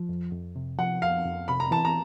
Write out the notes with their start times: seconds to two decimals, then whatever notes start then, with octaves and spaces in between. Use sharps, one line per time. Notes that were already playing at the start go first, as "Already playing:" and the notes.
Already playing: F3
0.09 F2
0.32 F2
0.56 C3
0.79 F3 F#5
1.02 F2 F5
1.25 F2
1.48 C3 B5
1.60 A#5
1.71 E3 A5
1.85 A#5